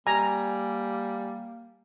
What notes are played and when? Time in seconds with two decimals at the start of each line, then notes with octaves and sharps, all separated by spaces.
0.07 G3 A#3 G#5 A#5